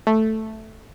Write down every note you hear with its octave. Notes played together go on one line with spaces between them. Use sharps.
A3